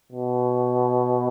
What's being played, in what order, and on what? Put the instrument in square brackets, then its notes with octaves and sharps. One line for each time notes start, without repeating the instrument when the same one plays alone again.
[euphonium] B2